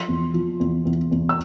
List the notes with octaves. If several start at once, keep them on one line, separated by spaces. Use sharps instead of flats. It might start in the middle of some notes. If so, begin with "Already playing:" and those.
Already playing: F3 C6
E2
F3
E2
E2
E2
E6